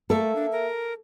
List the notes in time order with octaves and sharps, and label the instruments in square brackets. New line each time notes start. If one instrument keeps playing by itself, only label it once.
[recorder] A3 [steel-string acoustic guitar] A#3 E5 [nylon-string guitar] A4
[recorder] D4
A#4